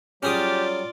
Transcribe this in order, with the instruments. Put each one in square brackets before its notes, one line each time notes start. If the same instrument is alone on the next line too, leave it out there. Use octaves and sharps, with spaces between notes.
[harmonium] F#3 G3 [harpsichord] C#4 G#4 D#6 [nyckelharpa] F4 D5 [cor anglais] G4